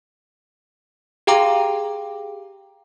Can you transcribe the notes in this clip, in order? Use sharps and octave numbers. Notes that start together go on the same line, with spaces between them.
G4 G#4 F5 G5 A#5 D6